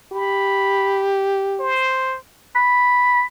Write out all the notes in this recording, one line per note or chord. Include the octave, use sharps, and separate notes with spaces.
G4 B5
C5
B5